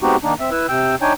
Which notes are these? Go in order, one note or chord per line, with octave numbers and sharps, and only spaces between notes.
G#3 B3 C4 D#4 F#4 G4
D#3 A#3 D4 D#4
C4 E5
E4 B4 E6
C3 G5 E6
D4 D#4 C#5 G5 G#5